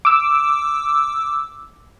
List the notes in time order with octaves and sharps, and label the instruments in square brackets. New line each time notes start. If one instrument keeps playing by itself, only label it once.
[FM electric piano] D6 E6